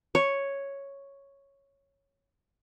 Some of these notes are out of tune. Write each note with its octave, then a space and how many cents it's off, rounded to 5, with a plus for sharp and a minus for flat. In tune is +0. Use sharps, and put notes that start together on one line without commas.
C#5 +0